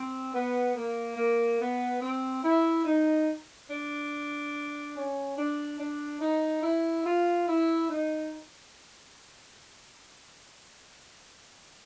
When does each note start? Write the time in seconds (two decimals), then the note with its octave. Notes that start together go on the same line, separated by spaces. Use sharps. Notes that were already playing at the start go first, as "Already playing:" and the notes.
Already playing: C4
0.33 B3
0.75 A#3
1.17 A#3
1.59 B3
2.01 C4
2.43 E4
2.85 D#4
3.69 D4
4.95 C#4
5.37 D4
5.79 D4
6.21 D#4
6.63 E4
7.04 F4
7.47 E4
7.89 D#4